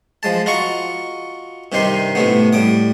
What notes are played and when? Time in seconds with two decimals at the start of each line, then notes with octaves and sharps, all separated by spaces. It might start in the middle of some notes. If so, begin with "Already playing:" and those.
0.23 F3 G#3 A5
0.46 F4 F#4 D#5 A#5 C#6
1.72 G2 C3 D#3 D#4 G4 C6
2.15 A2 C3 A3 B3
2.53 A2 G3 D6 D#6